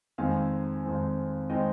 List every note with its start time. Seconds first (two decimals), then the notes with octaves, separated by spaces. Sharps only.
0.18 F2 D#3 G#3 C4 F5 G#5
0.84 F2 D#3 G#3 C4
1.49 D#3 G#3 C4 D#5 G5